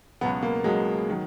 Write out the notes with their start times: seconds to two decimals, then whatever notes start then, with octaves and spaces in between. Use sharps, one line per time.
0.21 C#2 B2 F#3 B3
0.43 A#3
0.64 C#2 B2 F#3 G#3
1.09 D#3 F#3